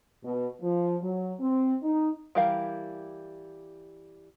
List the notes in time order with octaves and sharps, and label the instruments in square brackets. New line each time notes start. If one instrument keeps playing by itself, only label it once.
[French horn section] B2
F3
F#3
C4
D#4
[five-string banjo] E3 G3 G4 A#4 F5